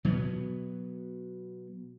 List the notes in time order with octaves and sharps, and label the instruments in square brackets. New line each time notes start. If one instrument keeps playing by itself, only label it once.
[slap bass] B2 F#3 B3